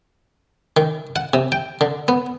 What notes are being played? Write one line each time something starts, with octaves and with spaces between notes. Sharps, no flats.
D#3
F#5
C3
G5
D3
B3